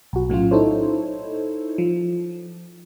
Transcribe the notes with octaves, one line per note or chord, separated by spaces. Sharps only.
B1 F#4
A2 F#3 C#4 F4
D#4 E4 A4 C5 C#5
F3